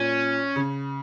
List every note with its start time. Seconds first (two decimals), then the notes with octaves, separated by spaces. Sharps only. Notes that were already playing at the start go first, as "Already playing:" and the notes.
Already playing: A#2 C#4
0.56 C#3